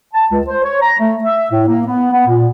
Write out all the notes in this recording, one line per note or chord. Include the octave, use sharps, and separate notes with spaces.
A5
C#2
C5
C#5
A#5
A3
E5
A2
A#3
B3
B3
A#2